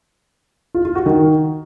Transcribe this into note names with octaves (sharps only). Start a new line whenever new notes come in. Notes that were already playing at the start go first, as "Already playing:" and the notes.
F4
F4
F#4
D#3